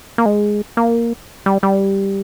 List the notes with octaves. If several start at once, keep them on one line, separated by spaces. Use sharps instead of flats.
A#3
G#3
A#3
G3
G3